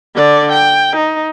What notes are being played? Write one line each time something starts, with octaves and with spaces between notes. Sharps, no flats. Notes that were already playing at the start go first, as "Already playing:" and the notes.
D3 D5
G5
D#4